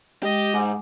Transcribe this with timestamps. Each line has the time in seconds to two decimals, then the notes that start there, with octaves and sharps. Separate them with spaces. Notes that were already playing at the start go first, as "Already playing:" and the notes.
0.23 G#3 G4 D#5
0.54 G#2 F#5 G#5 D6